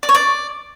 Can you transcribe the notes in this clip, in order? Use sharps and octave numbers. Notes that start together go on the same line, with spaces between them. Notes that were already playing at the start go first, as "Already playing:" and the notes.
D5
C#5
D5